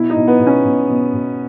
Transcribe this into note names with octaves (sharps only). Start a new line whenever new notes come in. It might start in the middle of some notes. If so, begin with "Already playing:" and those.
Already playing: B2 E4
D#4
B2
B3
B2
C#4
B2
B2
B2